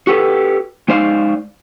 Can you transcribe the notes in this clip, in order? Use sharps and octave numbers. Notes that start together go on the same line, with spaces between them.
F#4 G4 A4 B4
G#3 D#4 C5 D5 F5